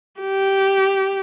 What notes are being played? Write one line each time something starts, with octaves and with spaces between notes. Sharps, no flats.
G4